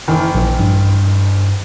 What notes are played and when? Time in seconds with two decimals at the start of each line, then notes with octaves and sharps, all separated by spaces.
0.08 F#1 D#3 E3
0.35 A#1
0.60 G2